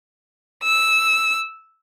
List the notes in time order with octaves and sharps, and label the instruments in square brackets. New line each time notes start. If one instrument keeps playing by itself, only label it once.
[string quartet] E6